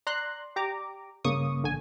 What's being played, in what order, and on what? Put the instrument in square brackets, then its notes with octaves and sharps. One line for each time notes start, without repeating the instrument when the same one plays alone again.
[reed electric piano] D5 [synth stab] A#5 C6 F#6
[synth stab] G4 A#5 D6
[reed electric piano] G2 C#3 A#3 [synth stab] C#6 D#6
[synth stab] A1 D3 G#5